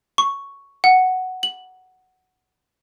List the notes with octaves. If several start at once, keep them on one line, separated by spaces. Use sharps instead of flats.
C#6
F#5
F#7